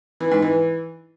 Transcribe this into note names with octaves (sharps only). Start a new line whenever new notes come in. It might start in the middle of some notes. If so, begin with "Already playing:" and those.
E3
G#2
E3